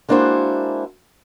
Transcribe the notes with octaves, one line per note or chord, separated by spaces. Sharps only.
G#3 A#3 D4 E4 F#4 C5